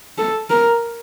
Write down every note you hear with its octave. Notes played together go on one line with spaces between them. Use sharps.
A4
A#4